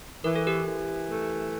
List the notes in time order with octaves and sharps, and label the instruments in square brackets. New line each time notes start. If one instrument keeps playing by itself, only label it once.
[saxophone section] E3 [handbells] A#4
[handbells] A4
G4 A#4
[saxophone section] E3
A3